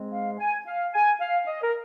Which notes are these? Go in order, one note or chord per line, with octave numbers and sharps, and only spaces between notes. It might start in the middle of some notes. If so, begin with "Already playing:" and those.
Already playing: G#2 G#3 C4
F5
G#5
F5
G#5
F5
D#5
A#4